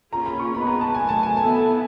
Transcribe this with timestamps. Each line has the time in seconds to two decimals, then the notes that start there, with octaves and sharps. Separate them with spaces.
0.12 A#3 C#4 F4 G#4 A#5
0.26 B5
0.39 C#6
0.54 G#3 B3 D#4 G#4 B4 B5
0.67 A#5
0.81 A5
0.95 D#3 F#3 A3 G#5
1.09 A5
1.23 G#5
1.36 B3 E4 A4 A5